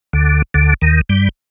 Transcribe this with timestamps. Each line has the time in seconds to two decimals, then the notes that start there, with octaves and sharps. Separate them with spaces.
0.13 D2 D3
0.54 D2 D3
0.82 D#2 D#3
1.09 G2 G3